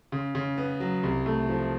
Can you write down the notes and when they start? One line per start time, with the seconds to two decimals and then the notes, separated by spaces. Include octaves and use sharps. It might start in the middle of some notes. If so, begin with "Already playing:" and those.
0.12 C#3
0.35 C#3
0.58 B3
0.80 F#3
1.03 C2
1.26 A3
1.49 F3